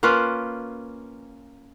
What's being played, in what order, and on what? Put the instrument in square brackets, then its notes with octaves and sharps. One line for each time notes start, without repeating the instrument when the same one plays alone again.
[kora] A#3 C#4 F4 B4